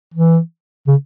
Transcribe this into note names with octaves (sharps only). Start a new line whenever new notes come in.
E3
C#3